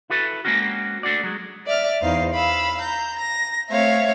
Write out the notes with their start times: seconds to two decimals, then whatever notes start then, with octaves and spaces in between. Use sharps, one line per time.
0.10 E4 F#4 A4 B4
0.45 G#3 A#3 C4 C#4 F#4
1.03 A3 D4 F#4 D5
1.23 F#3 G#3
1.65 D5 E5 F6
2.01 E2 D#4 C5 F5
2.33 F5 B5 E6
2.81 A#5 G6
3.18 A#6
3.71 A3 C4 C#5 E5 F5